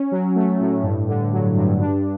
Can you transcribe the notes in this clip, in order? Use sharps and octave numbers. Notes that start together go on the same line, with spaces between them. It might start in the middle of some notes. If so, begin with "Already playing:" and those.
Already playing: C#4
F#3
A3
A2
G2
D3
F#3
G2
D4